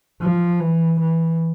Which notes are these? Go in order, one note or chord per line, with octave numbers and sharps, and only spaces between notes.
F3
E3
E3